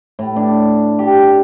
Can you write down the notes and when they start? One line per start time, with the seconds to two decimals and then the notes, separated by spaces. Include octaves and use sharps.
0.19 A2
0.36 D4
0.99 G4